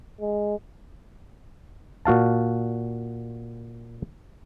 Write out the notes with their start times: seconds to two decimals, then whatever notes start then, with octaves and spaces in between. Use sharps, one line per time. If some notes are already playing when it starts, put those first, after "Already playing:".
0.21 G#3
2.05 A#2 F#4 F5 A5